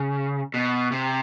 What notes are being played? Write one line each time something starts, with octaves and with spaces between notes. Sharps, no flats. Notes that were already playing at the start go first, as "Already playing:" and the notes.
Already playing: C#3
B2
C3